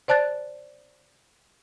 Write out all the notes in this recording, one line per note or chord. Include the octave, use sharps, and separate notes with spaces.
C5 D5 A5 F#6 A6